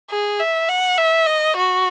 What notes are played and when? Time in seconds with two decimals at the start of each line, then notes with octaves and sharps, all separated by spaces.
0.11 G#4
0.40 E5
0.69 F#5
0.98 E5
1.27 D#5
1.56 F#4